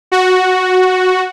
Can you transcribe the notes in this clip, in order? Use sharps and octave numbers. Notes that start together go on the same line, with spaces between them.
F#4